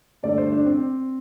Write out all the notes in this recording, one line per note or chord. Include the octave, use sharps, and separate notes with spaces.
G2 D3 A3 D5
C5
D4
C4